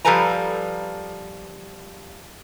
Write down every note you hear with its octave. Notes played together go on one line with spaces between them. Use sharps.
F3 G3 A4 B4 G#5 A#5